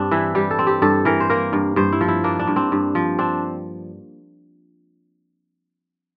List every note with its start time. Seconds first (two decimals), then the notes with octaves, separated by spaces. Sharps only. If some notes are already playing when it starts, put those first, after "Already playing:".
Already playing: G2 C4 D4
0.11 E3 E4
0.35 G3 G4
0.51 A4
0.59 C4
0.67 G4
0.82 G2 A4
1.05 E3 A#4
1.20 C5
1.30 A#3 A#4
1.53 G2
1.76 G2 C5
1.92 E4
2.01 F3
2.08 E4
2.24 A#3 D4
2.39 D4
2.47 G2
2.56 C4
2.72 G2
2.95 F3
3.19 C4 D4